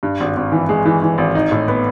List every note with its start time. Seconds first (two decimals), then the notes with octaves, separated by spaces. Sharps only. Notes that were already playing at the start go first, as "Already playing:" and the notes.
0.03 G2
0.20 G#1
0.37 G#1
0.52 E3
0.69 G#3
0.85 E3
1.02 E3
1.18 G#1
1.35 D#4
1.52 A2
1.68 B3